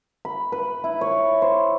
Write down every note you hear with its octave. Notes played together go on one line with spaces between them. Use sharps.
B5
B4
E4
C#5
C5